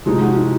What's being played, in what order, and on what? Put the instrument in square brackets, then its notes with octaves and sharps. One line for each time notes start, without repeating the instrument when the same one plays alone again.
[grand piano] C3 F3 G#3 C4 D#4 [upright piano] G4
[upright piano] F#4
E4